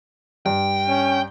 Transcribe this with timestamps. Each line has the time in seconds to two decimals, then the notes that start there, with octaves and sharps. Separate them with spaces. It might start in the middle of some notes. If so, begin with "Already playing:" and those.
0.46 G2 G5
0.89 C#4